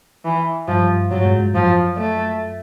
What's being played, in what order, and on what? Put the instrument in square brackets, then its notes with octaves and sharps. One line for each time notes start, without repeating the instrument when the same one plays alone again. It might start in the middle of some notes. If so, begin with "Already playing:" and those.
[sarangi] E3
[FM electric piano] G2 [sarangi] F3
[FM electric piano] G#2 [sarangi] F#3
[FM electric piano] G#2
G#2
[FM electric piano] F#2 [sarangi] F3
[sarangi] A3